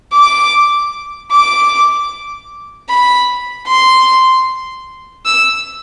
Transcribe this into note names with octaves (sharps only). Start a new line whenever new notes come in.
D6
D6
B5
C6
E6